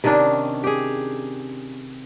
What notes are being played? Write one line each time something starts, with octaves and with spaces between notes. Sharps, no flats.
C3 D#3 C#4 D4
G4 G#4